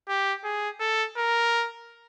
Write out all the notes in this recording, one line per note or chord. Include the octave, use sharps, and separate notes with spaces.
G4
G#4
A4
A#4